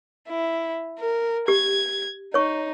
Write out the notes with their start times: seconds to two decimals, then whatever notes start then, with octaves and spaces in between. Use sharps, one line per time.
0.29 E4
0.99 A#4
1.48 G4 G#6
2.34 D#4 C#5 C#6